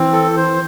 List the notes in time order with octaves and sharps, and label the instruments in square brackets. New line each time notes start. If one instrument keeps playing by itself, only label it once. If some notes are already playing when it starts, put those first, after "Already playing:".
Already playing: [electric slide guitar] E3 [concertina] C4
[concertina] A4
C5